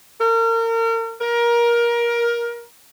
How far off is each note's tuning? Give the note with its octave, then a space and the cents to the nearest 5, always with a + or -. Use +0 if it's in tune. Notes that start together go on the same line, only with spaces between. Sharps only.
A#4 -35
A#4 +20